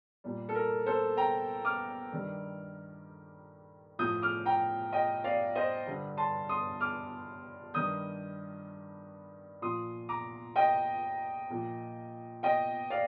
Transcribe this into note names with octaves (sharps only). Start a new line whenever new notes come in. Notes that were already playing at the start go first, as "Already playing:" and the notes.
A#2 G3
A4
A#4
A4 C5
G5 A#5
D6 F6
G2 D#3 G3
A2 F3 D#6 G6
D6 F6
G5 A#5
D#5 G5
D5 F5
C5 D#5
G2 D3 G3
A5 C6
C6 D#6
D6 F6
G2 D#3 G3 D#6 G6
A#2 F3 C6 D#6
A#5 D6
D#5 G5
A#2 F3
D#5 G5
D5 F5